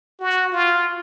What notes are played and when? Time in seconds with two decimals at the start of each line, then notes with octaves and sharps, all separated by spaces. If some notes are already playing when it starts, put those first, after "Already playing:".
0.20 F#4
0.52 F4